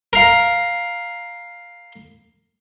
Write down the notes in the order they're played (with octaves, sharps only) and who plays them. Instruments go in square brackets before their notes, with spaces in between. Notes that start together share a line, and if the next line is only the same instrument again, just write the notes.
[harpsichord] A#4 F5